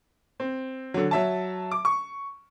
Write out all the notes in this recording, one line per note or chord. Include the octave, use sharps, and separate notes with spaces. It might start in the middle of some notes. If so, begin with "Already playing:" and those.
C4
D3 F#3
F#3 E5 A5
D6
C#6